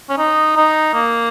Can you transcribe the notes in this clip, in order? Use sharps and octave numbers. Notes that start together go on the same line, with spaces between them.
C#4
D#4
D#4
A#3